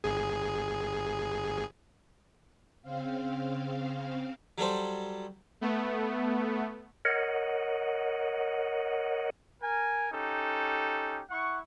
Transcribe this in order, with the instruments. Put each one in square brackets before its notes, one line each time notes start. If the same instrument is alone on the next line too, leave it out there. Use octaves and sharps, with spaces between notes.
[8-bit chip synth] G1 G#4
[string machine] C#3 C4 F5
[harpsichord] F#3 G3 A4 C5
[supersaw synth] A3 B3
[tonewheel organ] A#4 C#5 D#5 F#5
[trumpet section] A#4 G#5
C#4 D#4 G4 A4
E4 F#5 C#6